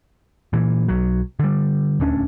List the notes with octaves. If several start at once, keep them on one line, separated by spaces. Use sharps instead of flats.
A#2 E3
B1 F#3
D3 G3
D#1 D2 C#4 D4